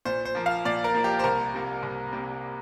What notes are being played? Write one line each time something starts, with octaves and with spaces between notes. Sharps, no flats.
A#2 C5
C5
F3 A#3
F5
A#2 D5
A#4
F3 A#3
G4
C5
C2 A#4
C3 A#3
C2
C3 A#3